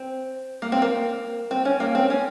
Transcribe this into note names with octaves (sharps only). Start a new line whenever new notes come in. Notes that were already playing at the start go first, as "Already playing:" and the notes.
Already playing: C4
A#3
C4
A#3
C4
C#4
A#3
C4
C#4